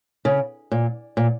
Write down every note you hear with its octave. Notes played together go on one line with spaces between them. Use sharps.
C#3
A#2
A#2